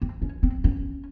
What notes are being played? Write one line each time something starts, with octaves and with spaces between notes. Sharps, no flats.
C4
C#4
C4
C#4